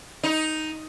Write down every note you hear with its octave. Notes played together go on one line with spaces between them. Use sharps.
D#4